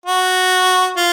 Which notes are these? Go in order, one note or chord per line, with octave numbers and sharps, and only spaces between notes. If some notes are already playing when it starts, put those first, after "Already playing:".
F#4
F4